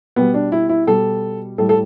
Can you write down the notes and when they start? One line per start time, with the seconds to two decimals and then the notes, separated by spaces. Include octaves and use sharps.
0.16 B2 G3 B3
0.34 D4
0.52 E4
0.69 E4
0.87 B2 G3 A4
1.58 A2 G3 A4
1.69 A4